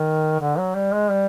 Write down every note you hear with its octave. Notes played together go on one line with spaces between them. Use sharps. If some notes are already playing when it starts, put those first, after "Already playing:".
Already playing: D#3
D3
F#3
G3
G#3
G3